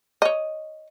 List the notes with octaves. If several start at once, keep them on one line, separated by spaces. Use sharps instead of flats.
C#5 D#5